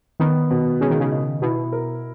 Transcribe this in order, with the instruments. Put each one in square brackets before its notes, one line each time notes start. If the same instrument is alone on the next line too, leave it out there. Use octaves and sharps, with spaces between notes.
[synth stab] D#3 [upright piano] B3
[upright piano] B2
[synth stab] C#3 [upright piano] G#3
[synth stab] D#3
C#3
[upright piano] D#4
[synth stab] B2 [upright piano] E4
[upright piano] A#4